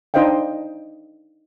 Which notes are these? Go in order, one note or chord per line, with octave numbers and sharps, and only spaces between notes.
D4 D#4 C5 D#5 F5 G5